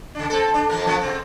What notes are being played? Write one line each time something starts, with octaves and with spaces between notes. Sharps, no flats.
C#3 D4
C4 A4
D4
F2 A#3 A#4
F3 A#3 B3
C3 C4